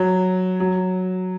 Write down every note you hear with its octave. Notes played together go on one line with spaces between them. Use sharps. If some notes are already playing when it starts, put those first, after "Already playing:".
Already playing: F#3
F#3